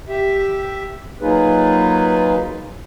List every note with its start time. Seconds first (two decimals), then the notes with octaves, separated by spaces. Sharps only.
0.09 G4 E5
1.21 F#3 A#3 D#4 F4 G#4 B4